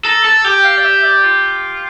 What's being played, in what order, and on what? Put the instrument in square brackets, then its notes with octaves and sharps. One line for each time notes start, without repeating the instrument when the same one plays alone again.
[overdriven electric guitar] A4 [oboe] A#5
[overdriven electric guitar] A4 [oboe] A5
[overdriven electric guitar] G4 [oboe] G5
[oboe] F5
D5
E5
D5
F4